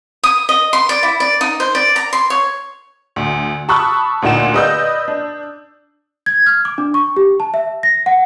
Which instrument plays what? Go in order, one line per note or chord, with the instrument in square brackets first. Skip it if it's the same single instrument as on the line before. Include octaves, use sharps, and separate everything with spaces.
[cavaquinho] D#6
D#5
C6
D5
E4
D5
D#4
C5
D5
A#5
C6
C#5
[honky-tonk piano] D2
A5 B5 C#6 D#6 E6 F#6
D2 A#2 D#4 F#5 E7
B4 D5 D#5 D#6 E6 G6
D4
[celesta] G#6
F6
D6
D4
C#6
G4
A5
E5
A#6
F#5